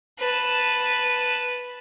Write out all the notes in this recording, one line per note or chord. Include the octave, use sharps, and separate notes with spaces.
B4 A5